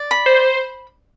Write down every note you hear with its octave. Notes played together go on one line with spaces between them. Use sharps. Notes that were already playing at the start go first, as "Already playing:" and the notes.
Already playing: D5
B5
C5